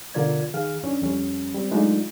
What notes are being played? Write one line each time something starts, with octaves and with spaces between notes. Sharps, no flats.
B2 D3 F4 A#4 D5 G#6
D#3 G#4 F5 F6
F#2 C#4 D4
F2 G3 C#4
G3 C4
F#3 G#3 A3 D4 D#4 F4